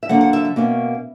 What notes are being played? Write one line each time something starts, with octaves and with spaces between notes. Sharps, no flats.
E5
D3 F#3 A#3 F#5
F#5
E5
E5
B2 A#3 C#4